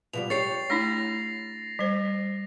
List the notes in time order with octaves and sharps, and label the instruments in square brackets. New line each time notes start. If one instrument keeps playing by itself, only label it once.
[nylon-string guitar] B2 F3 G3 [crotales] F7
[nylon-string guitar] G4 C#5 [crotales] A6 C7 F7
[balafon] A3 D4 E4 [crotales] A#6
[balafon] G3 C5